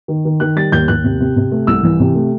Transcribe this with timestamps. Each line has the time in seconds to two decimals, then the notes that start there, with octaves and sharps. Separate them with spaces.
0.08 D#3
0.25 D#3
0.40 D#3 F#6
0.56 G3 A6
0.72 D#2 G6
0.88 D#2 F#6
1.04 C3
1.20 C3
1.36 C3
1.52 A3
1.67 C2 E6
1.83 E3
2.00 C3
2.15 A3